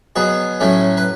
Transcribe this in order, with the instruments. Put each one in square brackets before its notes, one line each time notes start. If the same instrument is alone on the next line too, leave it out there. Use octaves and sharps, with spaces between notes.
[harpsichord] B2 F#3 B3 G#4
A2 F#3 A3 C#4
B4